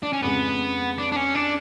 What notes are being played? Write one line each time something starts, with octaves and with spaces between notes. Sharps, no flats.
D4
C#4
F2 C#3 G#3 B3
D4
D4
C#4
D4